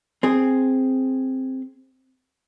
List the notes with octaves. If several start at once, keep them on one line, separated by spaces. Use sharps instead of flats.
C4 G#4